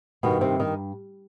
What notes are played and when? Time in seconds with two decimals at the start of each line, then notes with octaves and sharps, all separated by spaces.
0.23 G2 B2 D#3 B3
0.41 C3 C4
0.59 D#3 D#4